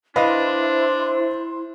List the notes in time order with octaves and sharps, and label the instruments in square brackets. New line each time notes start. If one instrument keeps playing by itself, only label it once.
[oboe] D4 [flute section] E4 C6 [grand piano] B4 D#5 F5 [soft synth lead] C5